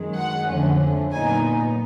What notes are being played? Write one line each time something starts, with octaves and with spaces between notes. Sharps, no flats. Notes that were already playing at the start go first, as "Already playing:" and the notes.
Already playing: F#2 D#3 G#3
F#5
F2 D3 F3 A3 C#4
A#2 F#3 B3 D#4 G#5